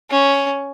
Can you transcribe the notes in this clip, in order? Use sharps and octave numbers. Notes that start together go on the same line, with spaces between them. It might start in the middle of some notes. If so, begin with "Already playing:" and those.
C#4